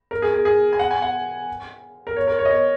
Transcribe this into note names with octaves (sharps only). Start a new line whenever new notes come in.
A#4
G#4
G#4
G#4
G#5
F#5
G#5
F#5
A#4
C#5
A#4
C#5
D#5
C#5